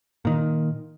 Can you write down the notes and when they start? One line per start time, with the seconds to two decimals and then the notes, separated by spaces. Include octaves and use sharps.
0.25 A#2 D#3